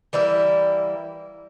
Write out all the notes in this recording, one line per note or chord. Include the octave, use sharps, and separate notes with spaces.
E3 G3 A#3 E4